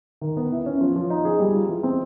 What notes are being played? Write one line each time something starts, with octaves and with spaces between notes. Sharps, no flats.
D#3
B3
E4
C#4
F3
F3
D#4
G#4
G3
F4
E3
C4